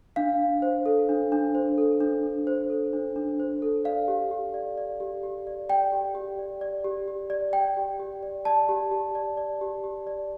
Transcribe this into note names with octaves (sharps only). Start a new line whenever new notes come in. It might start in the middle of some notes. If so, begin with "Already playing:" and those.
D4 F5
D4
C5
A4
D4
D4
C5
A4
D4
D4
C5
A4
D4
D4
C5
A4
D5 F5
G4
G4
D5
D5
G4
G4
D5
D5 G5
G4
G4
D5
D5
G4
G4
D5
D5 G5
G4
G4
D5
D5 A5
G4
G4
D5
D5
G4
G4
D5